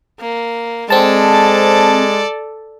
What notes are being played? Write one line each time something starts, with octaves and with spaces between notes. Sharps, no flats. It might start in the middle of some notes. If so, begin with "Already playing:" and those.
A#3
G#3 C4 A4 D5 A5